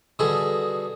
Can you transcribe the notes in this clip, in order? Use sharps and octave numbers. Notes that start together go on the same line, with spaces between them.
B2 D3 G3 G#4 A4